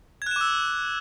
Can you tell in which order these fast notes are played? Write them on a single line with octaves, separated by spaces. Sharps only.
G#6 F#6 E7 D6 E6